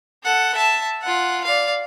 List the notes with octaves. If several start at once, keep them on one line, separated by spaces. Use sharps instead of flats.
A4 F#5
E5 A5
F4 F#5
D5 F5